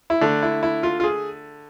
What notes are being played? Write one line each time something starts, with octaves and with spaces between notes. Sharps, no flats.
E4
D3 A3 D4
E4
E4
F4
F4
G#4